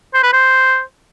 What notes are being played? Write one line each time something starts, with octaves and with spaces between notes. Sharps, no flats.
C5
B4
C5